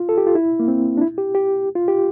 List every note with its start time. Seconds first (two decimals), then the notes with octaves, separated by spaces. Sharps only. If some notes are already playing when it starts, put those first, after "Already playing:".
Already playing: F4
0.09 A4
0.18 G4
0.27 F4
0.35 E4
0.60 A#3
0.68 C4
0.97 D4
1.01 E4
1.18 G4
1.35 G4
1.75 F4
1.88 G4